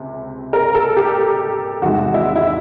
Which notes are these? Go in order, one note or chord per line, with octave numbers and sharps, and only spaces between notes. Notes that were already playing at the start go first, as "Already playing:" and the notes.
Already playing: C#2 C3
A#4
A4
G4
E2 C3 D#3 G#3 F#4
E4
E4